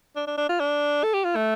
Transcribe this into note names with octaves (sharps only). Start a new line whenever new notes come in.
D4
D4
D4
F4
D4
A4
G4
F4
A3